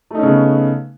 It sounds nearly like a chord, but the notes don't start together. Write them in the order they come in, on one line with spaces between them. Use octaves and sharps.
A3 D#4 C#4 C#3 B3